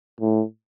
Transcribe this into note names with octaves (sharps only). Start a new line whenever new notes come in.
A2